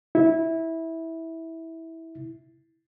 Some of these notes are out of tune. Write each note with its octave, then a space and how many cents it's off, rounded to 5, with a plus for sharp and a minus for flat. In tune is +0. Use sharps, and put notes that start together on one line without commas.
E4 -15